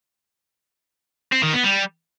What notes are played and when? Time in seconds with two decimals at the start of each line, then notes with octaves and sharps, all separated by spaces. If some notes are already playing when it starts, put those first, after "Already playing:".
1.32 C4
1.43 D#3
1.53 B3
1.64 G3